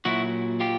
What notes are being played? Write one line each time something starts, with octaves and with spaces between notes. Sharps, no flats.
A#2 F#3 E4 F#4
F4 G4